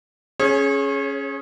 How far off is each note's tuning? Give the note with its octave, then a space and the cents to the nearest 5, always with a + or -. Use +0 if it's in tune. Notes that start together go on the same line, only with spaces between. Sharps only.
C#4 +0 G#4 +20 C#5 -35